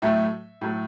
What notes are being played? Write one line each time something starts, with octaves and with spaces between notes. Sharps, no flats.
A2 F#3 A3 E5
A2 F#3 A3